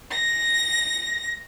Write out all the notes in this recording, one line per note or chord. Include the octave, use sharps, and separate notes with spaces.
A#6